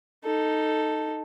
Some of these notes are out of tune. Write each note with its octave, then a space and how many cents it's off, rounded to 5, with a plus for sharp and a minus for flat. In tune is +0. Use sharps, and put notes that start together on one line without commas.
D#4 +0 A4 +5